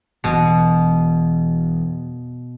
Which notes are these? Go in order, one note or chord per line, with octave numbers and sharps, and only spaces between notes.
E1 B2 E3